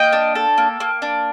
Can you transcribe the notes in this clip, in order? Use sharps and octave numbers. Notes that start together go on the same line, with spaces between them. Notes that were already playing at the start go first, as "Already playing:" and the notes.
Already playing: A#3 D#5 G5
D4
A4
A#3
A#3
D4